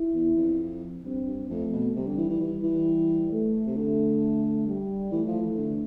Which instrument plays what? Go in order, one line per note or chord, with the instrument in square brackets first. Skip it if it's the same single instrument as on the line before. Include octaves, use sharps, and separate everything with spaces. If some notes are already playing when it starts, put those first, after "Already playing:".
Already playing: [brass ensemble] E4
[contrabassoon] E2
F2
[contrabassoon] G2 [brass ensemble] C4
[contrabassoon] G2
[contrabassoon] F2 [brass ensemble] A3
[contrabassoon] B2
[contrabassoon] C3 [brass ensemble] G3
[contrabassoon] D3
E3
E3
[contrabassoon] E3 [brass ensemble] G3
[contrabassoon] E3
[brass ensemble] A3
[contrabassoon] C3
[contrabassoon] D3 [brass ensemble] A3
[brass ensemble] G3
[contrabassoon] E3 [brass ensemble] A3
[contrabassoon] F3
E3
D3